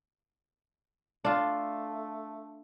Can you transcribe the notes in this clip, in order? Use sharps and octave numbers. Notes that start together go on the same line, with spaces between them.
A3 D4 F4